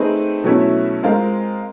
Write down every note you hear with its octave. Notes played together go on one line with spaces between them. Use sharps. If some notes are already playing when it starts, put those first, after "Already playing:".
Already playing: A3 C4 D#4 G#4 B4
B2 F#3 A3 C#4 E4
G#3 C4 F4 A#4